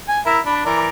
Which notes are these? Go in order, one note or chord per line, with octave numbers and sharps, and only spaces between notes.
G#5
E4 A#4 E5
D4 B5
E3 A#4 D5